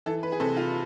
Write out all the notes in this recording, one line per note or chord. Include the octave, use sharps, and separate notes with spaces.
E3 A4
B4
G#4
C3 A4
F4